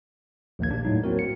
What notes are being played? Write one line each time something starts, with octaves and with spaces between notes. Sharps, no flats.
A#1 D#2 A#3 G#6
D4 G4
A2 F#3 D#4
F#3 A#3 C4 F#4 A#4
C#7